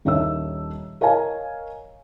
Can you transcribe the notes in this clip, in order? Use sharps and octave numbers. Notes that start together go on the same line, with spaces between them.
D#1 D#3 D4 C#5 E5 E6
A#4 C#5 D#5 F5 G#5 A#5